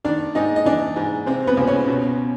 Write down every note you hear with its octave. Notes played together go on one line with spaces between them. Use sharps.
D#3 D4 D5
G#2 D#4 D#5
D#5
E3 D4 D5
G#2
C3 C4 C5
B3 B4
C#2
C#4 C#5
B2